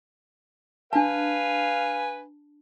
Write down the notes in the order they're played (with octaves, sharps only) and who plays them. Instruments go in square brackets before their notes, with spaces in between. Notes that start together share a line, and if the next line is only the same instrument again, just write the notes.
[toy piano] D4 A5 [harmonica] B4 F5 G#5